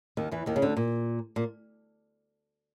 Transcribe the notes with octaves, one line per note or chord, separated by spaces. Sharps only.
D#2 D#3
E2 E3
D#2 D#3
C#3
D2 D3
A#2
A#2